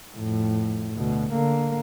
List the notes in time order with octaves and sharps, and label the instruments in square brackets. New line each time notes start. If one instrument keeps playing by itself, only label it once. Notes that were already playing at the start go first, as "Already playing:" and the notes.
[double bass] F2 A2
D2 B2
D3 A#3